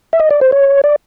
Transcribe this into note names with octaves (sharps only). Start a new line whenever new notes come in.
E5
D#5
D5
C5
C#5
D5